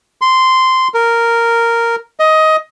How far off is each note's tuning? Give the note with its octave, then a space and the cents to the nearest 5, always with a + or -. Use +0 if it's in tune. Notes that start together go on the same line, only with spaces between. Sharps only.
C6 -10
A#4 -5
D#5 +15